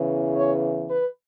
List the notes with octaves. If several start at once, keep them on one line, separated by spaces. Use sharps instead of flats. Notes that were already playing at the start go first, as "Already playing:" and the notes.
Already playing: E2 C#3 E3
C#5
B4